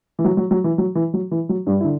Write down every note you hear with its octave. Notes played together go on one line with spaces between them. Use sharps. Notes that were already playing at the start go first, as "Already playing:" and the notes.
E3
F#3
F#3
F#3
E3
F#3
E3
F#3
E3
F#3
G2 G3
E4
D3